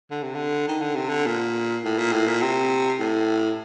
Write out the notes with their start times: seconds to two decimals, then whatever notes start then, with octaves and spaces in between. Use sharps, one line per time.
0.11 D3
0.23 C3
0.35 D3
0.68 D#3
0.82 D3
0.95 C3
1.09 D3
1.26 A#2
1.84 A2
1.98 A#2
2.12 A2
2.27 A#2
2.42 C3
2.99 A2